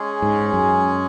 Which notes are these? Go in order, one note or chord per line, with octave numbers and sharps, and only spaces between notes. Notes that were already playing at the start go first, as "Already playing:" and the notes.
Already playing: G#3 C#4 G#4
G#2
F#2